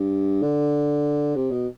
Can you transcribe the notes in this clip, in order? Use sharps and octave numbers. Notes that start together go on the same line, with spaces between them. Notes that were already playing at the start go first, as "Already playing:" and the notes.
Already playing: G2
D3
C3
B2